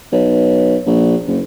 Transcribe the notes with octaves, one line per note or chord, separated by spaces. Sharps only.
B1
A#1
F#1